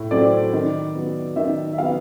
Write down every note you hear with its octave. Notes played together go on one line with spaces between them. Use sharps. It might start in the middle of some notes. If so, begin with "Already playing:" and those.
Already playing: A2
F#3 A3 C4 D5
D#3
F#3 B3
D#3 E5
E5
F#3 B3 F5